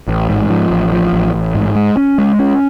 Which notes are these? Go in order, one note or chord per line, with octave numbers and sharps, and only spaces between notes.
A1
G#2
F3
A1
F3
A1
A1
G#2
G#3
C#4
G#3
C#4